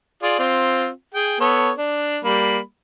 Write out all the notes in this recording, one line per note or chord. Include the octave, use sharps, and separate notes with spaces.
F4 G#4 D5
C4 F4
G#4 G5
B3 A4 C#5
D4
G3 A#3 B5